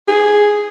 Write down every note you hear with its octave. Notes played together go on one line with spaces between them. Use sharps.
G#4